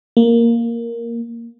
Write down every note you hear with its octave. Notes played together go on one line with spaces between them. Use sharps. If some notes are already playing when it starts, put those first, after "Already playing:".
A#3